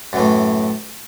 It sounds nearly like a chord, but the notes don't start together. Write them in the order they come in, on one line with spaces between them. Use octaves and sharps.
F#2 E3 A2